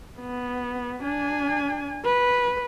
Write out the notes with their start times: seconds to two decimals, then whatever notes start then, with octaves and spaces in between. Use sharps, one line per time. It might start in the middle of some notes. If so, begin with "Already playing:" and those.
0.19 B3
1.03 D4 G#5
2.05 B4